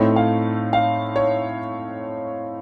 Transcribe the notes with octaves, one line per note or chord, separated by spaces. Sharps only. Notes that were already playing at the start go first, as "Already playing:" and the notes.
Already playing: A2 A3 C4 D#4 C#5
F5
F5
C#5